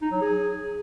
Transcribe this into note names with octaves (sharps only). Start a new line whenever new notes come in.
D#4
F#3
G#4